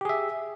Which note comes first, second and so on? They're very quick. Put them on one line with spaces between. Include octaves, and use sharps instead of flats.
G4 G#4 E5